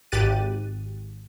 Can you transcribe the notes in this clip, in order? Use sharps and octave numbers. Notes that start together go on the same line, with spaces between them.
G#1 G4 F#6 A6 D#7